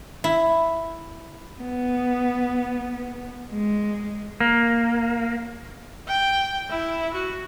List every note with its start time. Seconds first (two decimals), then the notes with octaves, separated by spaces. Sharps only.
0.24 E4
1.61 B3
3.53 G#3
4.41 A#3
6.08 G5
6.70 E4
7.14 F#4